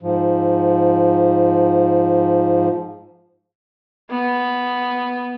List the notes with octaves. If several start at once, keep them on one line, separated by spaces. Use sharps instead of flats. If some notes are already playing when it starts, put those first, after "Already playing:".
G#2 F3
B3